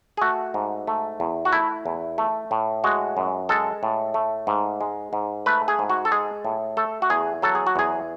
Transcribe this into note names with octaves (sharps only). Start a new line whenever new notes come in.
G#4
A3 F#4
G#2
A3
E2
F#4
A3 E4
E2
A3
A2
G#3 F#4
F#2
G#3 A4
A2
A3
G#2
G#3
G#2
A3 B4
G#4
G#2
F#4
A4
G#3 G#4
A2
A3 A4
F#4
E2 G#4
F#3 A4
G#4
F#4
E2 G#4